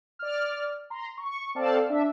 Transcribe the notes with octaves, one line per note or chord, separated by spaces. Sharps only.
D5 F6
A#5 C6
C#6
C4 A4 D5 F5 A5
D4 E5